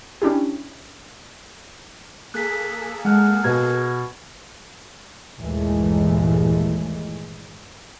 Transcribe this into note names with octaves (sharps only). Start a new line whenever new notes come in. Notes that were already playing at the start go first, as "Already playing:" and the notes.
C#4 D4 E4 G4
A#3 G#4 A4 F#6 B6
G#3 F#5 F6 F#6
B2 B4 G#6
G1 D#2 A#2 E3 G#3 A3